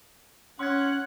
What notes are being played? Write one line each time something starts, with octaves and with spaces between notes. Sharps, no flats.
C#4 F#5 C6 F#6 G#6